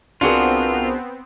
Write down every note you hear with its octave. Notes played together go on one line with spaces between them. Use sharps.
C2 B3 C4 D4 F4 F#4 G#4 A#4